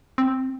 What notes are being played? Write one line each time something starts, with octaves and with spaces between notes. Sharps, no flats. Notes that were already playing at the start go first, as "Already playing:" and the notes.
C4